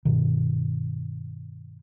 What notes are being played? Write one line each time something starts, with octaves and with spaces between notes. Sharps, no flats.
G2 B2 D#3